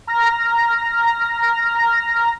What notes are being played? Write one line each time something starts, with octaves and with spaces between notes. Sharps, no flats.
A#5 F6 A#6